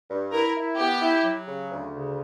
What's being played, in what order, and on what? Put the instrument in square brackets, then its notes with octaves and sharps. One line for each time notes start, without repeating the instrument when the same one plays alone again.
[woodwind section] G2
[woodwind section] E4 [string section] A#4
[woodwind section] E4
[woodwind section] B3 [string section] G4
[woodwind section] E4
F#3
C#3
D2
C#3